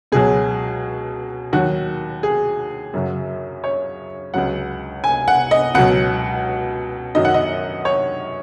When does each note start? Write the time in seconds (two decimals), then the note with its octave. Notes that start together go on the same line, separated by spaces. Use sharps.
0.12 C#2 B2 F#3 G#4
1.53 D#2 D#3 F#3 F#4
2.23 G#4
2.94 F#2 C#3 F#3
3.64 C#5
4.34 C#2 C#3 F#3 F#5
5.04 G#5
5.28 F#5
5.51 D#5
5.74 C#2 B2 F#3 F#5
7.15 F#2 D#3 F#3 D#5
7.25 F#5
7.34 D#5
7.85 C#5